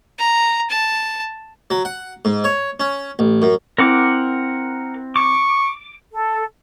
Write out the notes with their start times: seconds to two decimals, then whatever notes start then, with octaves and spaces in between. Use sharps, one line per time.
0.18 A#5
0.70 A5
1.70 F#3
1.85 F#5
2.25 G#2
2.44 C#5
2.80 C#4
3.19 A1
3.42 F#2
3.78 C4 E4 A#4 F#5 D6
5.16 C#6 D6
6.12 A4